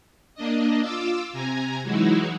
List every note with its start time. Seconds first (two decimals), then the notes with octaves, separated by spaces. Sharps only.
0.35 A#3 D4 D#5
0.81 F4 D6 E6
1.33 C3 G#5 A#5
1.82 E3 F#3 G#3 D#4 E4 F#4